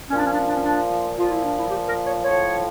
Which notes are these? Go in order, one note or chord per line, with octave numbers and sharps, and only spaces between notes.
A#2 F3 C#4 D4
C#4
D4
C#4
D4
C#4
D4
A#2 F3 F4
E4
D4
E4
G4
A#4
C#5
A2 F3 C#5